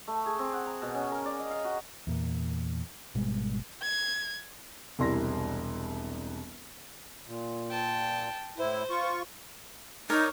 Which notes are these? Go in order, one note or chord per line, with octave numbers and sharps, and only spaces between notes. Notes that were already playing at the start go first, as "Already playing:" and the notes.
A3
G#4
C4
F#5
A#5
B2
C#4
A#4
D5
D#5
F5
F#4
E2 A#2
G#1 B2 G3 G#3
G#6
E1 C2 G3 E4 C6 A#6
A#2
G5 A5
A2 E4 C5
F4 C#6
D#4 A#4 C#5 D5